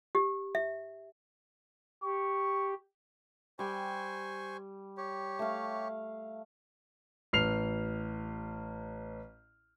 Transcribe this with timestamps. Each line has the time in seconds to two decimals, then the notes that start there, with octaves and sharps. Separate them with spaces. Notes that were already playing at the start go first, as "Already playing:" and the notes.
0.15 G4
0.55 E5
2.04 G4 C#6
3.59 G3 C5 G5 G#5 C#6
4.97 G4 C#5
5.39 A3 F5
7.33 A1 F6 C7 F7